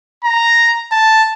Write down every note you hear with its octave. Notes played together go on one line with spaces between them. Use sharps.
A#5
A5